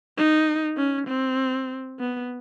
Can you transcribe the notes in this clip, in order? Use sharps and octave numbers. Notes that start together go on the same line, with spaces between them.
D#4
C#4
C4
B3